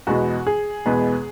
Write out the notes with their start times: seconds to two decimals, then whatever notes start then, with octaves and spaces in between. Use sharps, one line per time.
0.07 E2 B2 G#3 B3 F#4
0.47 G#4
0.86 E2 B2 G#3 B3